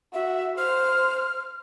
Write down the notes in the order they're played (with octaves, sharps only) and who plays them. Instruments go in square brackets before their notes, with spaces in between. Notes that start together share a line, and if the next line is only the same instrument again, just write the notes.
[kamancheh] F#4 [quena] E5
[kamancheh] C5 [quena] F6